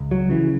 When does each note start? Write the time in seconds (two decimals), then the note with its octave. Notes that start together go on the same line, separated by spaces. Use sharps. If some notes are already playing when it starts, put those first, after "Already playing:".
Already playing: C#2
0.11 F#3
0.30 C#3 E3